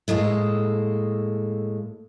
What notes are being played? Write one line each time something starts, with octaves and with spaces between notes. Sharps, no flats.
A2 G#3 A#3 A4